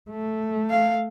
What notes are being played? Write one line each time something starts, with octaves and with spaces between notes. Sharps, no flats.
A3
F5